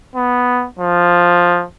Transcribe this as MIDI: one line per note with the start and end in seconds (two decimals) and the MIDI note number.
0.16 0.67 59
0.80 1.64 53